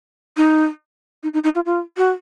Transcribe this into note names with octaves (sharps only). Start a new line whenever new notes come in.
D#4
D#4
D#4
D#4
F4
F4
F#4